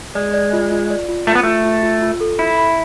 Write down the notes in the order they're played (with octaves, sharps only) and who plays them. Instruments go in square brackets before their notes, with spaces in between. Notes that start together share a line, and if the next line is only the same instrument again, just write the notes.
[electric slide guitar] G#3 [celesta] D5
[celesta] D5
F4
F4
D5
F4
[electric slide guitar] A3 [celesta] F4
[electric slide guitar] B3
[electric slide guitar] A3 [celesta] F4
[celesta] F4
F4
F4
A4
[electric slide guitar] E4 [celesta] B5
[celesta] B5